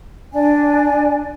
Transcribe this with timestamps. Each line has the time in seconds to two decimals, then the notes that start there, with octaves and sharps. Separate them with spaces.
0.33 D4 G#5